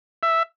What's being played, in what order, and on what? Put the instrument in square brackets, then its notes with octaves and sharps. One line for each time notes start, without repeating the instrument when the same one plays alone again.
[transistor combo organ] E5